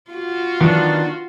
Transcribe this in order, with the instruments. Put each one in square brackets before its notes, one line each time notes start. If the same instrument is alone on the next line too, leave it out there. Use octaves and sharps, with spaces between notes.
[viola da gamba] F4 F#4
[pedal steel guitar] D#3 B3 D4 [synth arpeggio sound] E3 F#3